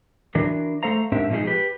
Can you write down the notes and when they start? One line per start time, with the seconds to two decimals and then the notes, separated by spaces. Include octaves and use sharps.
0.35 E3 D4 F#4 A#4
0.83 A3 A4 C5 F5 A#5
1.12 G#2 C4 D4 G4 A#4 E5
1.30 B2 F3 G#3 B3 D#4 G#4
1.47 G4 B4